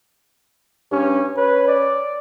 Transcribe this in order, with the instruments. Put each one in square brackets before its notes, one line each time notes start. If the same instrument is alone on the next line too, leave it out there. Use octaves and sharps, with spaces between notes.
[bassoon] G2 [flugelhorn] C#4
[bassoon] C#4 [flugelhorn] B4
[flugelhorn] D5